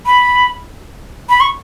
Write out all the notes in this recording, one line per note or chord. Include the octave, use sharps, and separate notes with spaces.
B5
B5
C#6